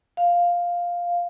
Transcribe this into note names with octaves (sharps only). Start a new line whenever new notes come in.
F5